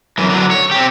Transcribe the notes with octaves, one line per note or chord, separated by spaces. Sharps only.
F#2 E3
D3 F#3
C#5
C4 G4